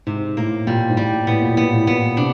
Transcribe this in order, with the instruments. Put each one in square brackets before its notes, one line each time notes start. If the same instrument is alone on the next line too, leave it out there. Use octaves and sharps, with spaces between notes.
[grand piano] G#2 [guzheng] C3
[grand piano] A2 [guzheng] A#3
[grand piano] A#2 [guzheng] G3
[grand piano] G#2
[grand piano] A2 [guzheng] G3
[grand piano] A2 [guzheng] B3
[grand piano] A#2
A2
[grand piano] A#2 [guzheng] B3
[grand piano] A2
[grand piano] A#2 [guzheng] B3
[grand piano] C3 [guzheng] D4